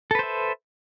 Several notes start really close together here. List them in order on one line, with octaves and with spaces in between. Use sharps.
A4 B4 C5 E5